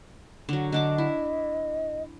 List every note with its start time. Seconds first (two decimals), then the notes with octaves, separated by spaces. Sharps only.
0.49 D3 F#3
0.72 D3 D4 D#5 D6
0.98 E4